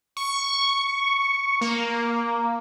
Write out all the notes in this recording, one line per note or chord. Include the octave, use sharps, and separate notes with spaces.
C#6
A#3